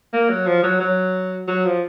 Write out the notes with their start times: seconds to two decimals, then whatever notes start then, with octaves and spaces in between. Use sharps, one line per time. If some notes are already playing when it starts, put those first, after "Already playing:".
0.13 A#3
0.29 F#3
0.46 F3
0.63 F#3
0.80 F#3
1.48 F#3
1.65 F3